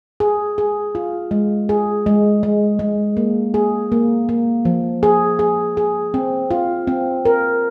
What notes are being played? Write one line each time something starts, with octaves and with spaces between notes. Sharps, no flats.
G#4
G#4
F4
G#3
G#4
G#3
G#3
G#3
A#3
G#4
A#3
A#3
F3
G#4
G#4
G#4
C4
F4
C4
A#4